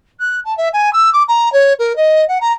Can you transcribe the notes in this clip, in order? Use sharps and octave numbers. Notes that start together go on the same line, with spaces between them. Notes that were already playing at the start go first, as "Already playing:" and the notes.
F#6
A5
E5
G#5
E6
D6
A#5
C#5
A#4
D#5
F#5
A#5